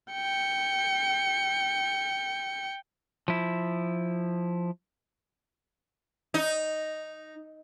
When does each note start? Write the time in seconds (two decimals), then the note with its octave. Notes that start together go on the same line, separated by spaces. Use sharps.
0.12 G5 C#7
3.28 F3 E4
6.34 D#4